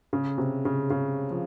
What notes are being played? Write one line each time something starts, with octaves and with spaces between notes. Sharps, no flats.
C#3
C3
C#3
C#3
F3